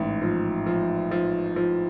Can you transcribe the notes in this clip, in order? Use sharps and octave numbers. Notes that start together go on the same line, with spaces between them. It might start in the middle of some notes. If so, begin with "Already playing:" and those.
Already playing: A1 G#2
F3
F3
F3
F3